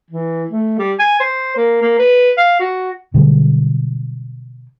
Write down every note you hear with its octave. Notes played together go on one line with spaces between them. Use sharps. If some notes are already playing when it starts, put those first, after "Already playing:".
E3
A3
G3
G#5
C5
A#3
A#3
B4
F5
F#4
B2 D3 F#3 G3